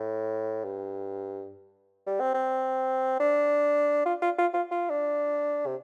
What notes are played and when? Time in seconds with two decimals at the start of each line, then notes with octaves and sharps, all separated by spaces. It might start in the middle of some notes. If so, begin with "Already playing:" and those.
Already playing: A2
0.65 G2
2.06 G3
2.20 C4
2.34 C4
3.20 D4
4.06 F4
4.22 F4
4.38 F4
4.53 F4
4.71 F4
4.90 D4
5.67 C3